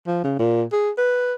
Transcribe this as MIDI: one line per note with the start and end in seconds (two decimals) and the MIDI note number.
0.07 0.24 53
0.24 0.37 49
0.39 0.63 46
0.72 0.91 68
0.98 1.35 71